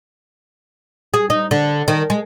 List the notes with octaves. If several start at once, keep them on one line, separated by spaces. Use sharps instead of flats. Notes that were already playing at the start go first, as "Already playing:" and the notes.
G#4
D#4
D3
D#3
G#3